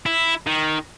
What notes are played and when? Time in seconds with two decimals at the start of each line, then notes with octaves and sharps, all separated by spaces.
0.06 E4
0.47 D#3